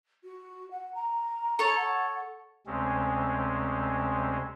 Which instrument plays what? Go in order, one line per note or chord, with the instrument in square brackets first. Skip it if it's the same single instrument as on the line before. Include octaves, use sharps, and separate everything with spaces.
[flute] F#4
F#5
A#5
[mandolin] A4 C#5
[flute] F#5
[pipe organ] D2 C3 G#3 C4 C#4